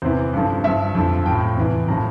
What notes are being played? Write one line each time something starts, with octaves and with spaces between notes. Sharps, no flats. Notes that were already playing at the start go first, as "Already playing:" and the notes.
E2 C3 E3 C5
G2 D3 F3
G2 F3 E5
F2 D3 F3
F3 G5
A2
E2 C3 E3
A2 F3 A#5